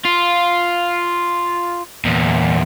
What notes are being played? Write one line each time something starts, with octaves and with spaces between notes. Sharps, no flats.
F4
E2 A#2